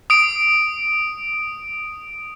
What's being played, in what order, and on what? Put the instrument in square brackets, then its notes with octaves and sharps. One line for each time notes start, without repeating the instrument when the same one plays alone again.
[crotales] D#6 D7